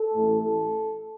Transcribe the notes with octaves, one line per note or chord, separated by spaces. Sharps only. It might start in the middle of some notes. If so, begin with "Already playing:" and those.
Already playing: A4
A1 A2 A3
A1 A4